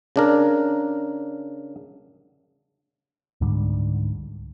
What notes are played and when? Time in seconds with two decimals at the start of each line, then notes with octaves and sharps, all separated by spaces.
0.16 C#3 D4 A#4
3.41 C#2 G#2 D3 G3